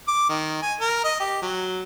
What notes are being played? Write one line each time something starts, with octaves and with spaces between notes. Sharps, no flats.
D6
D#3
G#5
A#4
D#5
G4
F#3